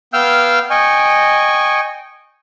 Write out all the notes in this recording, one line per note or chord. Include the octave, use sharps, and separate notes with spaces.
B3 F5 G5 E6 F6 G6
D#5 G5 G#5 C#6